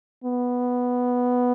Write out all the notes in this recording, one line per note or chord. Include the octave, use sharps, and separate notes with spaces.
B3